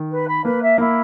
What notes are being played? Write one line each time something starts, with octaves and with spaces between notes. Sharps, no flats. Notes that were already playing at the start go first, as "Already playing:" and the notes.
Already playing: D#3
B4
B5
A#3 B4
E5
A#3 E4